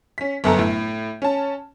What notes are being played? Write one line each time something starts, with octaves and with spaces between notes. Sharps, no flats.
C#4 B6
G1 F#2 A4 A#5
A2
C#4 A5